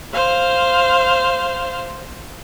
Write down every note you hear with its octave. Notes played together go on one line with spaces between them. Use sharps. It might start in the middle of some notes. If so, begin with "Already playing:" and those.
C5 F5